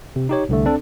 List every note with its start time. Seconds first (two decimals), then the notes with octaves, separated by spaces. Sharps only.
0.16 C3
0.29 D#4 G4 C#5
0.49 C2 D3 A3
0.66 C4 D4 A4